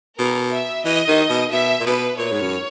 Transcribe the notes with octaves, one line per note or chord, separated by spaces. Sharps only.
B2 A#4
E5
E3 D#5
D#3
B2
B2 E5
A#2
B2 B4
A#2 C#5
G#2
F#2